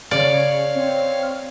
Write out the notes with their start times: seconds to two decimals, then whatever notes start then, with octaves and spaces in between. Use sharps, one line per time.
0.11 C#3 C#5 D5 F5
0.75 C4 C#5